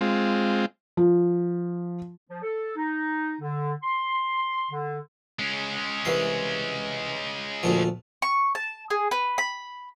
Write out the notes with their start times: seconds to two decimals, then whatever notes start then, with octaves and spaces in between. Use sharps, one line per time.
0.01 G#3 C4 F4
0.97 F3
2.30 F3
2.43 A4
2.77 D#4
3.41 D3
3.83 C6
4.71 D3
5.39 G#3 C#4
6.05 C2 E3 C6
7.63 D2 A#2 F3
8.22 C#6
8.55 A5
8.90 G#4
9.11 B4
9.38 B5